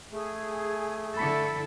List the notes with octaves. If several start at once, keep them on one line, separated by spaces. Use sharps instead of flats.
A3 G#4
D3 E4 A4 B5 B6 C#7